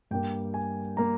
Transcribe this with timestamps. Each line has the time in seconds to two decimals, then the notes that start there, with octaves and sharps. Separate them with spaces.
0.11 G2 G3 A#3 G5
0.54 G#5
0.97 G3 A#3 A#5